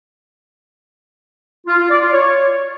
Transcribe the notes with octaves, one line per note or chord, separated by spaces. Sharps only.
F4
F4
D5
F4
C#5